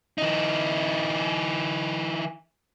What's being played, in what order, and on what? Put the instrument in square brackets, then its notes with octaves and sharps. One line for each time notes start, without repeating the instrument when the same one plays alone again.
[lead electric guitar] E3 D#4